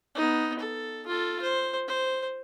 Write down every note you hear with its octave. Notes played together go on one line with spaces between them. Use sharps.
B3 D#4
A4
F4 A4
C5
C5